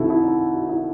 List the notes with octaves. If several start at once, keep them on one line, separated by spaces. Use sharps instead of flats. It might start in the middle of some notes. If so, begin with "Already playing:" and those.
Already playing: C2 C3 D#3 E4 F#4 A4
E4
D#4
F#4
E4